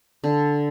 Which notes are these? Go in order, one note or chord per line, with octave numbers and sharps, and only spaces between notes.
D3